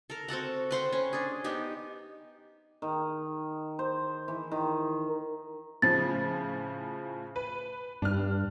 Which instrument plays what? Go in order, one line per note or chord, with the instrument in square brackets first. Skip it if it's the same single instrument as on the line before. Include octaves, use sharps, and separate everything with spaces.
[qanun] A4 A#4
C4 F#4 A4 F#5
B4 C5 F#5 G5
C#4
D4 G#4
B3 D#4 G4
[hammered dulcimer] D#3
C5
E3
D#3
[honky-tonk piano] A2 C#3 F3 [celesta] A6
[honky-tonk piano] B4
[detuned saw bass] G2 [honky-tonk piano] D4 F6